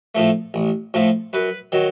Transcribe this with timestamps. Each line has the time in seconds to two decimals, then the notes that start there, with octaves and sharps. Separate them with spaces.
0.15 A2 F3 A3
0.54 A1
0.94 A2 F3 A3
1.33 F#2 B4
1.72 D#3 F#3